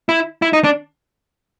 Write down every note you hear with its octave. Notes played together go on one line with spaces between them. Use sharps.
E4
E4
D#4
D4